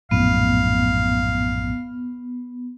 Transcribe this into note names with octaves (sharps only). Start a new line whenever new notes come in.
A#1 F#2 A2 B3 F5